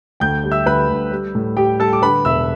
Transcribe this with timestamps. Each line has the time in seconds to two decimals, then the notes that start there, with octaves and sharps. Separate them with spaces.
0.20 D2 G5 G6
0.44 G3
0.51 E5 E6
0.66 D2 B4 B5
0.89 D2
1.11 G3
1.35 A2
1.57 G3 G4 G5
1.80 G3 A4 A5
1.93 D6
2.02 D3 B4 B5
2.25 E1 E5 E6